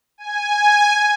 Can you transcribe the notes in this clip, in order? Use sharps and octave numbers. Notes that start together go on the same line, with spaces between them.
G#5